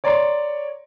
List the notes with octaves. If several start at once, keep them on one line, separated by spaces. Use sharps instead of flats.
C#5 D5 A#5 C6